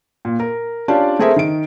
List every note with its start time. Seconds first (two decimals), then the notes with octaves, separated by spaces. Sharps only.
0.25 A#2
0.40 A#4
0.88 C#4 D4 F4 G4 D5 A5
1.19 A3 C4 G#4 A#4 C5 E5
1.36 D#3 D7